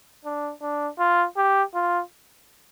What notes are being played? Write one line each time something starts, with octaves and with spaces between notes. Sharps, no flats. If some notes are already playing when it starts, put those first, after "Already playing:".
D4
D4
F4
G4
F4